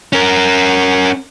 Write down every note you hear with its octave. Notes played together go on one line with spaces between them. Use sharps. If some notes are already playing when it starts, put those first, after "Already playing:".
C#4 A#4